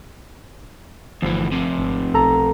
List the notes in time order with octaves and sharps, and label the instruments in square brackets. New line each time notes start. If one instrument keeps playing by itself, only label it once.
[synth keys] G1 F3 [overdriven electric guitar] D2 E3
[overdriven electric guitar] F2 C3
[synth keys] G#1
B1 A4 A#5